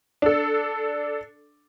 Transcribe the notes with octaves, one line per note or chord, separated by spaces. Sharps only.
D4 A4